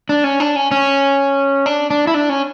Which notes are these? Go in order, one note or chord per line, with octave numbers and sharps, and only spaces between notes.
D4
C#4
D4
C#4
C#4
D4
D4
E4
D4
C#4